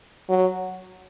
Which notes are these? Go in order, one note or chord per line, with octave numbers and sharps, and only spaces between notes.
F#3